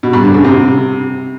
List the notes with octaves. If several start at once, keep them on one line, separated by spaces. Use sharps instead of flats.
B2
G2
D3
C#3
C3